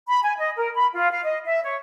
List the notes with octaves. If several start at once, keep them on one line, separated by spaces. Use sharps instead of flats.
B5
G#5
D#5
A#4
B5
F4
F5
D#5
E5
C#5